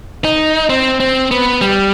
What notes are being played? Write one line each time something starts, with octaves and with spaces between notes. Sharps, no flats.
D#4
C4
C4
B3
G3